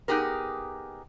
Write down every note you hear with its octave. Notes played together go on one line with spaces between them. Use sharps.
B3 D#4 G4 G#4 A#4